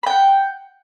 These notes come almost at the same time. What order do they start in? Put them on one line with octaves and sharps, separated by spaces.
B5 G5 F#5